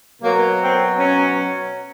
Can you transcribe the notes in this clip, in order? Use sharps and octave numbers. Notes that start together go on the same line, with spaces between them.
B2 F#3 A#3
C4
C#4